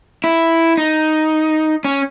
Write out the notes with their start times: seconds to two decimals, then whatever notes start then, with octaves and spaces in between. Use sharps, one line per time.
0.24 E4
0.77 D#4
1.84 C#4